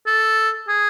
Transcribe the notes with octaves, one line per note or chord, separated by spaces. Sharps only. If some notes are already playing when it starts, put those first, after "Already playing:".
A4
G#4